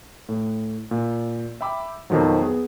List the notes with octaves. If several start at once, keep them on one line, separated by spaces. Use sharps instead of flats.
A2
A#2
E5 G5 B5 D6 E6
F2 B2 D#3 F3 F#3
B3 G#4